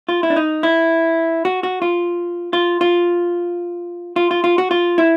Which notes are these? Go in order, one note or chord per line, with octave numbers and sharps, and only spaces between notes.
F4
E4
D4
D#4
E4
F#4
F#4
F4
F4
F4
F4
F4
F4
F#4
F4
E4